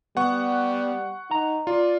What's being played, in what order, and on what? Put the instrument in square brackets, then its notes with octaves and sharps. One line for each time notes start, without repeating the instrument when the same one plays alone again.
[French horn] G3 [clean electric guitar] B3 [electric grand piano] F#5 C#6
[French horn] D#4 [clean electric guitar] A#5
[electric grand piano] F4 [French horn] D5